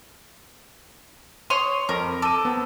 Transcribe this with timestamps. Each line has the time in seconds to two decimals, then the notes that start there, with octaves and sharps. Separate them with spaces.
1.50 C#5 C6 D#6
1.89 F2 A#4
2.22 A4 D6 D#7
2.45 B3 C4